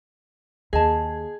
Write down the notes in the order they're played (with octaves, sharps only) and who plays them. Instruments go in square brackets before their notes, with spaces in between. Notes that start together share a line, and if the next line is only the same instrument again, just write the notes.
[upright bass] D#2 [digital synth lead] G#4 [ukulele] D#5 A5